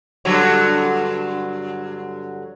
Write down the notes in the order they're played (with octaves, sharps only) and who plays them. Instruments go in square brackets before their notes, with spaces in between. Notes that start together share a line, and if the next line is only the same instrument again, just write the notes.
[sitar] G2 D3 F#3